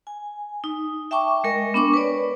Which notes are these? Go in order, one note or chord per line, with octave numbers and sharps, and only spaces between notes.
G#5
D#4
E5 G5 A5 C#6 D6
G#3 A#4 D#5
B3 D4 C#6 D6
B4 C#5 D5